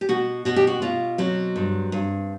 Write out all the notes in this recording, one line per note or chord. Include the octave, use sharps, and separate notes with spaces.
G4
B2 F#4
B2 F#4
G4
F#4
B2 F4
F#3 C4
G2
G2